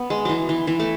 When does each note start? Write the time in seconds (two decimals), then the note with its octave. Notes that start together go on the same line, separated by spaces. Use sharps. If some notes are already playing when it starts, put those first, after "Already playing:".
Already playing: B3
0.10 G#3
0.25 E3 F#3
0.49 E3
0.67 E3
0.80 A3